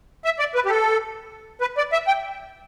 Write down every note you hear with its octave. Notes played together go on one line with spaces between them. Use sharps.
E5
D5
B4
G4
A4
B4
D5
E5
G5